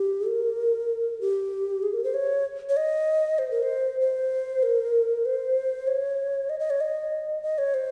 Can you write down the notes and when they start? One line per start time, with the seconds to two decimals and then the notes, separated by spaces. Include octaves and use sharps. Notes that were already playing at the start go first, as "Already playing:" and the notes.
Already playing: G4
0.27 A#4
1.21 G4
1.83 G#4
1.93 A#4
2.04 C5
2.14 C#5
2.69 C#5
2.77 D#5
3.39 C5
3.51 A#4
3.63 C5
4.01 C5
4.63 A#4
5.25 C5
5.87 C#5
6.50 D#5
6.60 D#5
6.70 C#5
6.81 D#5
7.43 D#5
7.58 C#5
7.74 C5